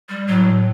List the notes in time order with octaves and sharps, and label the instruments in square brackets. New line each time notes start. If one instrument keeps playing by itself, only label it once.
[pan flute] G3
[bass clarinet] A2 [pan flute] F#3